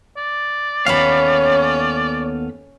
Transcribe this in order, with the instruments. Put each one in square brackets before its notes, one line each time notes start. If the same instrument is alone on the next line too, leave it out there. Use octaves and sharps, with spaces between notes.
[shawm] D5
[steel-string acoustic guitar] D#2 B3 A4 [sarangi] C#4 [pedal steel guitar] F5 B5